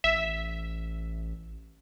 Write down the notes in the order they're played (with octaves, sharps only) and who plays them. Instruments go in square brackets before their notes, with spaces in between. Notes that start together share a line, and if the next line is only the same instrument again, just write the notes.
[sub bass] A1 [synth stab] E5